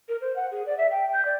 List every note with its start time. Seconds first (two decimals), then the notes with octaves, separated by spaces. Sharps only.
0.09 A#4
0.21 C5
0.36 F#5
0.51 G#4
0.66 D5
0.78 E5
0.91 G5
1.13 G6
1.25 D5